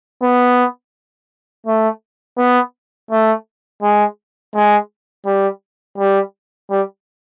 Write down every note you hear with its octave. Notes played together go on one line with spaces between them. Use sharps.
B3
A3
B3
A3
G#3
G#3
G3
G3
G3